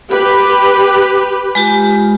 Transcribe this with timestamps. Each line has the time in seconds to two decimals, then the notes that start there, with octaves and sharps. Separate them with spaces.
0.11 G4 B4 B5
1.55 G#3 F4 G4